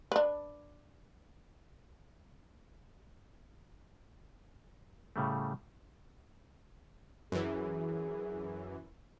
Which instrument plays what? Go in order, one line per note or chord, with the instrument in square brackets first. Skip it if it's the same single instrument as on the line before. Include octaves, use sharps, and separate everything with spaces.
[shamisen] D4 B4
[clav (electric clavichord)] A2 C#3 G3 A3
[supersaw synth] F#2 E3 [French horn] G#4